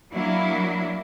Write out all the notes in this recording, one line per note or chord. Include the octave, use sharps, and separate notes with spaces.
F#3 A#3 D4 E4